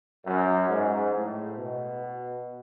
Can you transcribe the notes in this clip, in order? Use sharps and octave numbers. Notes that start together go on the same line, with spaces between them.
F#2
G#2
A2
B2